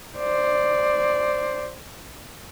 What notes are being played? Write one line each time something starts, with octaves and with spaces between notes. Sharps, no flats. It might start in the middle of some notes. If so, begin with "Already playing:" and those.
C5 D5